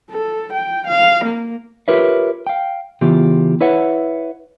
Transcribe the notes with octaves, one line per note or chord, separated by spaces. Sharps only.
A4
G5
F5
A#3
F4 G4 A#4 B4 C#5 E5
F5 G5
C#3 E3 B3 F4 G4
E4 B4 C#5 E5 F#5